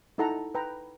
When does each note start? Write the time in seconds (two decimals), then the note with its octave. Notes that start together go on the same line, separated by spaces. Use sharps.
0.18 D#4 E4 A4 F#5 A#5
0.55 B4 G5 A#5